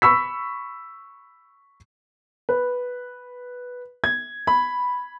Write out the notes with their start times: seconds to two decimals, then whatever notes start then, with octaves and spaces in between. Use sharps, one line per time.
0.02 B5 C#6 E6 B6
2.49 B4
4.04 G#6
4.47 B5